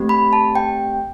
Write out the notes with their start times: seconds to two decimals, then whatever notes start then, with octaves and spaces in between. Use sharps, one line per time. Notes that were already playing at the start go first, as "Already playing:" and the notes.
Already playing: A3 C4 G4
0.09 B5
0.33 A5
0.55 G5